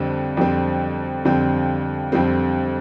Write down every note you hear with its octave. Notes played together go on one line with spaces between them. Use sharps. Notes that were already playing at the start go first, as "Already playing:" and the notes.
Already playing: F2 D3 G3 C4
F2 D3 G3 C4
F2 D3 G3 C4
F2 D3 G3 C4